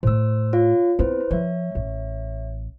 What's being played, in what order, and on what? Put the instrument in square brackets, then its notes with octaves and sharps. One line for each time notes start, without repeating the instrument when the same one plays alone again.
[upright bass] A2 A3 [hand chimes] C5 E6
[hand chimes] F4 C#5 F5
[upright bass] B3 C4 [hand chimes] E4 B4 C5
[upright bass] F3 [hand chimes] C#5 E5
[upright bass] A1